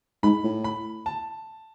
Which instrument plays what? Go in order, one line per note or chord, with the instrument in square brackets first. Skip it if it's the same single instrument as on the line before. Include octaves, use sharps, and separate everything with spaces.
[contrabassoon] G#2 [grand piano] B5
[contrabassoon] A2
[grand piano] B5
A5